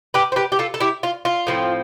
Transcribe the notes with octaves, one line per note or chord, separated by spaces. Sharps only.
G4 B4
C5
G4 B4
G4
F4 A4
A4
E4 G4
F4
F4
A2 F3 C4